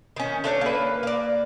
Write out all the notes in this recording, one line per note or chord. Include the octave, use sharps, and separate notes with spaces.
D#3 C#4
A3 D4 B4 C#5
A#3 B4
A#3 D5